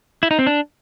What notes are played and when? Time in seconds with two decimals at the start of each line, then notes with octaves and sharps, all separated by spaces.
0.23 E4
0.31 D#4
0.39 C4
0.47 D4